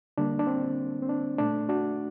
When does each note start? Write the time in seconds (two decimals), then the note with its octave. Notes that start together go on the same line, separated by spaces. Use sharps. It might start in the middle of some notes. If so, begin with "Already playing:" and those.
0.18 D3 G3 A#3 D4
0.39 D4
0.47 C4
1.02 C4
1.09 D4
1.38 A#2 A3 D4
1.69 D4 F#4